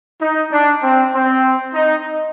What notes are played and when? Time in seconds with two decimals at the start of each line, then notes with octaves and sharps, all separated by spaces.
0.21 D#4
0.52 D4
0.83 C4
1.14 C4
1.74 D#4